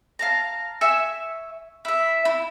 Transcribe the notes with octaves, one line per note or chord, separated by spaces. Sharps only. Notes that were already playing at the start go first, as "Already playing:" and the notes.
F5 A5 A#5
E5 G#5 C#6 E6
E4 E5
E4